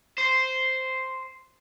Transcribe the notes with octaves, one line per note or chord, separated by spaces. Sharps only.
C5